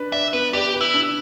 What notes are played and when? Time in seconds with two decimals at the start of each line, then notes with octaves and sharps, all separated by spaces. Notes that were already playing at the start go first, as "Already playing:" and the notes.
Already playing: D4 B4
0.12 D5 E5
0.33 B3 B4
0.53 G4 D5
0.74 B4
0.81 E4
0.94 D4